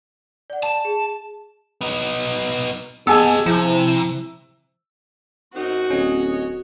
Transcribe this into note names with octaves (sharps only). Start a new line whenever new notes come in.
D5 F#5
A5
G#4
B3 D#4
B3 G4 G#4 D#5 G#5 A5 E6
C3 F3 E4
F#2 C4 D#4 F#4
D1 C#4 C#5 D#5